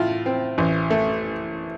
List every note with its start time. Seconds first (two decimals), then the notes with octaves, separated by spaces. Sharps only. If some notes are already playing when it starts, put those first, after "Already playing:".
Already playing: A2 F4
0.26 C4
0.58 A1
0.91 A3